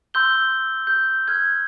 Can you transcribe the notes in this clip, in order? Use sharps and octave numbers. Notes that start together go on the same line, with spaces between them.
C6 E6 G6 G7
G6
F6 G#6